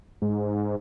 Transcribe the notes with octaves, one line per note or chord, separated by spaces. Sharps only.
G#2